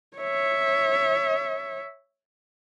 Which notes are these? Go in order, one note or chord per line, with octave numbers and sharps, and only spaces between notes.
C#5 E5